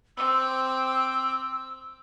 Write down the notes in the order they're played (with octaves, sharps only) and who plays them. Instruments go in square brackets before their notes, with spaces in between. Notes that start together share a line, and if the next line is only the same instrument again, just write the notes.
[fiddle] C4 D6 [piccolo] E6